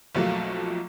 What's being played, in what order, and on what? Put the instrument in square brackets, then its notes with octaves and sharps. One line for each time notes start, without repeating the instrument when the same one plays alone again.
[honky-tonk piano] B1 F2 F3 F#3 A3 A#3